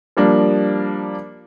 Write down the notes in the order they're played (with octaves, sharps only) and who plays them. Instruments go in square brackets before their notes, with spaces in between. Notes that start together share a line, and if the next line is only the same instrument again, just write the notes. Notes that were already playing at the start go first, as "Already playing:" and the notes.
[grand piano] F3 G3 A#3 D4